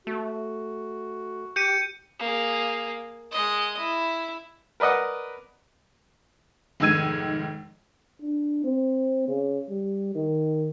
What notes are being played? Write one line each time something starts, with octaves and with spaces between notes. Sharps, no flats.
A3 F#4
G4 G6 C#7 D#7
A#3 G#4
G#3 D#5
E4
A#4 B4 D5 D#5 F#5
F1 G#2 D#3 E6 G#6 D#7
D4
C4
C#3
G3
D#3